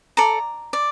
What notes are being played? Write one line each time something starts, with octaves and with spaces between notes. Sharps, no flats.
A4 D5 A#5
D5